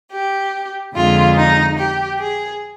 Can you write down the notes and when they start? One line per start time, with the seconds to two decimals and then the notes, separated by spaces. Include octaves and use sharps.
0.11 G4
0.94 F2 D3 G#3 F4
1.36 D#4
1.77 G4
2.19 G#4